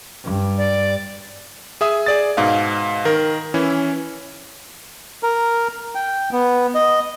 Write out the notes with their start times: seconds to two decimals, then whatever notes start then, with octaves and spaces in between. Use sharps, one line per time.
0.23 G2
0.58 D5
1.81 G#4 E5 D#6
2.06 G#4 D5 A6
2.37 G#2 B2 F5
3.05 D#3 A#4
3.54 E3 C#4 E4
5.23 A#4
5.95 G5
6.32 B3
6.75 D#5